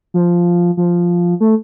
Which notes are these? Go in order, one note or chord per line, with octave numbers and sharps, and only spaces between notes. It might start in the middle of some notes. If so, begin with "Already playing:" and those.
F3
F3
A3